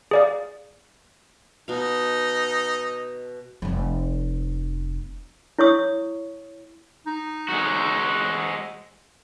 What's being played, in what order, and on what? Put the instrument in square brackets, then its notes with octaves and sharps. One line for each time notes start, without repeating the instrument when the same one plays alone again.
[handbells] G#4 D5 F5
[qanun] B2 F5 [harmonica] D#4
[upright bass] F1 F3
[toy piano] E4 C#5 C#6 D#6
[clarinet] D#4
[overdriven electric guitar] G#3 F#4